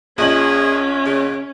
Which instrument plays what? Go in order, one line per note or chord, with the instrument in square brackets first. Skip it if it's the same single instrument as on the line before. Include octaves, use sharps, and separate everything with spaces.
[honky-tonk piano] A#1 D#5 F#7 [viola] C#4 [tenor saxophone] G#4
[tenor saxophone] C#3